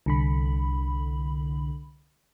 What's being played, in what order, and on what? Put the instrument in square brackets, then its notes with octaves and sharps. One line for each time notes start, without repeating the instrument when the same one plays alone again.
[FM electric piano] C2 D3 B5